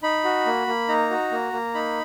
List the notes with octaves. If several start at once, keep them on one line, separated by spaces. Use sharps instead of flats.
D#4 B5
F#4
A#3
A#3
D#4 A#5
F#4
A#3
A#3
D#4 B5